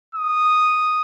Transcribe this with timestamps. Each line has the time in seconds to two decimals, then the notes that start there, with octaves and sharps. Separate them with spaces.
0.15 D#6